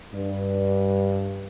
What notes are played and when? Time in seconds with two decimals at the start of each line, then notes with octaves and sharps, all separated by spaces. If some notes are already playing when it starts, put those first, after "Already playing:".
0.13 G2